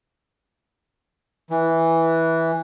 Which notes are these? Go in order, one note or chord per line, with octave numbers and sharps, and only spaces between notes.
E3